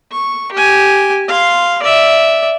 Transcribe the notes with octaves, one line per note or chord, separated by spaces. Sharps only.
C#6
G4 G#5
F5 C6
D5 E5